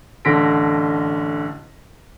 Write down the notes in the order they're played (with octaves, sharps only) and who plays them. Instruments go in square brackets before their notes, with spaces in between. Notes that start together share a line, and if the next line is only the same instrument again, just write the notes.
[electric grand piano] A1 D3 C6 A#6 B6 D7